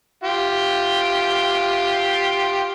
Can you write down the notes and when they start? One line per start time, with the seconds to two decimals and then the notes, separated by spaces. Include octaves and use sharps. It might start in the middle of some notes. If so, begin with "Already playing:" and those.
0.24 F4 G4